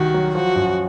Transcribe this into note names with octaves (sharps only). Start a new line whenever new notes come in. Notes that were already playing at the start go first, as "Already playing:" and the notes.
Already playing: C2 D#3 F#4
F#3
F3 F#4
F#2